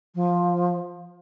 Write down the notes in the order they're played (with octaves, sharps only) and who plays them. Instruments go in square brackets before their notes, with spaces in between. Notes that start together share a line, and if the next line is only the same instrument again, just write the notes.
[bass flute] F3